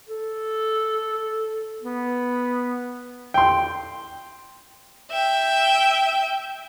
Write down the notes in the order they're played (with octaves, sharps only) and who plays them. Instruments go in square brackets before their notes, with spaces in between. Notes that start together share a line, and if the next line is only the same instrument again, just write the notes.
[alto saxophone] A4
B3
[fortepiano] G5 C6
[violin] E5 G5